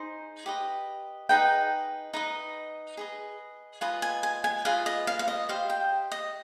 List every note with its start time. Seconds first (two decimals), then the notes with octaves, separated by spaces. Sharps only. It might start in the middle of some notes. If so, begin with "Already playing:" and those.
Already playing: D#4 G#4 C5
0.46 G4 B4 D#5
1.29 D#4 G#4 B4 D#5 G5
2.13 D#4 B4 D#5
2.97 G#4 B4 D#5
3.81 F4 B4 D#5 G#5
4.02 G#5
4.23 G#5
4.44 G#5
4.65 F4 G#4 B4 D#5 F5
4.86 D#5
5.07 F5
5.19 F5
5.28 D#5
5.49 G4 C5 D#5 F5
5.70 G5
6.12 D#5